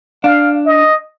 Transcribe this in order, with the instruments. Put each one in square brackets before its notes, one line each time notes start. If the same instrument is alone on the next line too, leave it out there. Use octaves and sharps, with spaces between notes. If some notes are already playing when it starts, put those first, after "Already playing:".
[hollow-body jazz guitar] D4 [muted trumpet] F5
[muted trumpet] D#5